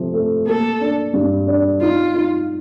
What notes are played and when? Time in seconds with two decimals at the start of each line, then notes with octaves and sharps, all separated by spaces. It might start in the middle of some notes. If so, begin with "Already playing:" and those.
Already playing: C3 F3 A3
0.14 A3
0.47 A#3 A4
0.80 D4
1.14 G2
1.47 D4
1.81 D#4 F4
2.14 D#4